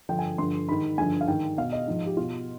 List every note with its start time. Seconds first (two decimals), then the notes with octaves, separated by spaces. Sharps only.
0.09 G2 D3 F3 G5
0.19 G#5
0.38 G2 D3 F3 C6
0.69 G#2 D#3 B5
0.98 G2 D3 F3 G#5
1.21 F5
1.28 G#2 D#3 G5
1.58 B2 F5
1.72 D#5
1.87 G#2 F3
2.06 G4
2.17 B2 F4